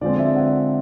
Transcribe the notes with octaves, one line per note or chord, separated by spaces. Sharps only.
D3 F3 G#3 C4 D5
E5
F#5